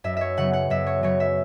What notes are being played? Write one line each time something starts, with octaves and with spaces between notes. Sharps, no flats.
F#2 E5
C#5 E5
C#3 F#3 B3 F#5
F#5
F#2 E5
C#5
C#3 F#3 B3 C#5
E5